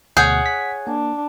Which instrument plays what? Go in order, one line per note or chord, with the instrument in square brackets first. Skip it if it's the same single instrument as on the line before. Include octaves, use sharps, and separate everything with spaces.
[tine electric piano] D2 B2 [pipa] G#4 [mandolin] C#5 F#5 G6
[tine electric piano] B6
[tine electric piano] A#3 [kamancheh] D4